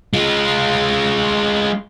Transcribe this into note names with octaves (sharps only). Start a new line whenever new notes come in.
G#3 F4